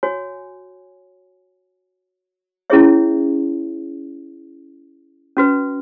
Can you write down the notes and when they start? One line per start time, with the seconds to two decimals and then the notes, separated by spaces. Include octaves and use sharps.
0.03 F#4 C#5 G#5
2.70 C#4 E4 G#4 C#5 E5
5.37 C#4 F#4 B4